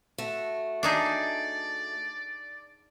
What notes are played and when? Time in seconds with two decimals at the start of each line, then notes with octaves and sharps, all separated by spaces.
0.18 A3 F#4
0.83 D4 D#4 G#4 D5